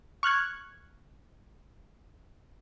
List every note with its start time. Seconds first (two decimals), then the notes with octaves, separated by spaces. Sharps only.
0.23 C#6 F6 F#6 G#6